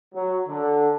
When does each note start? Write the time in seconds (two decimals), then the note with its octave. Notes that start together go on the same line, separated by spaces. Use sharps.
0.14 F#3
0.47 D3